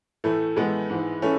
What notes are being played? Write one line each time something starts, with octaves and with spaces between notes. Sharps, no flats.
A2 E3 A3
A2 E3 G#3 B3
G#2 E3
E3 A3 C#4